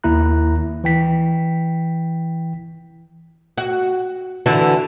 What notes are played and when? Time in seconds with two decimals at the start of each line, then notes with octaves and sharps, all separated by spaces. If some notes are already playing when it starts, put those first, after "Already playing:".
0.04 D#2 A#3 E4 A#5 F#6
0.84 E3 G5 B6
3.58 F#4
4.46 D3 E3 F#4